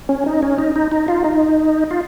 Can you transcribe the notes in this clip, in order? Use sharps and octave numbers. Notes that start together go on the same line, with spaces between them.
C#4
D#4
C#4
D#4
D#4
D#4
F4
D#4
F4